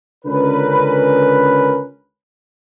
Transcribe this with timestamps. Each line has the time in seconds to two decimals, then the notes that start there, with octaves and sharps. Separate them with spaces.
0.25 C#2 D3 C#4 A#4 B4